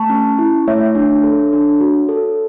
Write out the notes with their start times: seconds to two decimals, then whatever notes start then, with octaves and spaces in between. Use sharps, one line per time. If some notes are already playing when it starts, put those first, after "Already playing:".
Already playing: A3 A5 C#6
0.10 C#4
0.39 E4
0.67 A3 C#5 E5
0.95 D4
1.23 A4
1.53 D4
1.80 F#4
2.09 A4